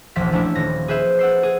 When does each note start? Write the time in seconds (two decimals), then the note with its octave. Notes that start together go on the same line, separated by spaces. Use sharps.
0.16 E1 A#1 F3 B6
0.32 F3 A3 C#4 D4 E4
0.55 D#1 A#6
0.88 G#4 B4 C5 E5
1.19 F#5 E6 C7
1.43 G#4